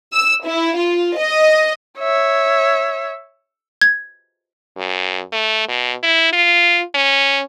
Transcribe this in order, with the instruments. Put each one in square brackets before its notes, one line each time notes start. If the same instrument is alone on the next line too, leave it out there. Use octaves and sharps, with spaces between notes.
[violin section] E6
E4
F4
D#5
[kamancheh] C#5 E5
[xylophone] G#6
[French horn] F#2
A3
B2
E4
F4
C#4